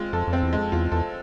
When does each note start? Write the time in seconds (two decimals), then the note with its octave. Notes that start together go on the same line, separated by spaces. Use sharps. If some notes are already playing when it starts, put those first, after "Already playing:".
Already playing: G#3 C4 F4
0.13 F2 A4
0.27 F2
0.33 C4
0.43 E2
0.53 F2 G#3
0.72 E2 F4
0.92 E2 A4